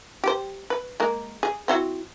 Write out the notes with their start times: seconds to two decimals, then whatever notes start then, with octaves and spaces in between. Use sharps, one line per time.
0.24 G4 C5
0.70 B4
1.00 G#3 A#3
1.43 G#4
1.68 C4 E4 F#4